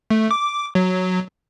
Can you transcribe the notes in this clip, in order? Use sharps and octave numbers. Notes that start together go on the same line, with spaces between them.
A3
D6
F#3